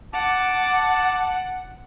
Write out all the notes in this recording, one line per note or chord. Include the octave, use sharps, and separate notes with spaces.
F#5 A5 D6